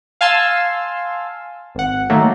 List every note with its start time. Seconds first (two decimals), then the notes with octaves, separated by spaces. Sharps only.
0.21 F5 G#5 A5 C6 E6
1.75 G#1 F#5
2.10 D#3 F#3 A3 A#3